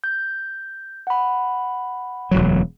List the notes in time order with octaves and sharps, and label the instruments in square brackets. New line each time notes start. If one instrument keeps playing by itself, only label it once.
[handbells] G6
F#5 B5
[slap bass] E1 D2 F#3